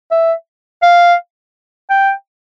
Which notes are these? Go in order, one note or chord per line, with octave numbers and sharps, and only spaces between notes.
E5
F5
G5